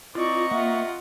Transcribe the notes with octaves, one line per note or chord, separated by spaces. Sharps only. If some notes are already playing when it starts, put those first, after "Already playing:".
C4 E4 F4 D5 D#5 A#5 C#6
A#3 F4 E5 F#5